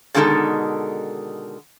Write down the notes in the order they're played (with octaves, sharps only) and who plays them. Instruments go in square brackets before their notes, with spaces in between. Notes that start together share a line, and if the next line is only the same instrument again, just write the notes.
[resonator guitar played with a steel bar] B2 D3 D#3 G#3 D#4 A4